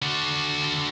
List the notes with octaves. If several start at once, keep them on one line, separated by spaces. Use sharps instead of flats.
D3 F#4